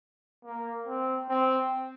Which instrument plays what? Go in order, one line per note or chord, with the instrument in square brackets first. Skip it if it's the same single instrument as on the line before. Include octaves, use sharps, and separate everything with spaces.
[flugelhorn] A#3
C4
C4